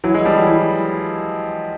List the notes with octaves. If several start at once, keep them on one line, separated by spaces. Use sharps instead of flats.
E3 F#3
F#3 G#3
F3 G3
E3 F#3
E3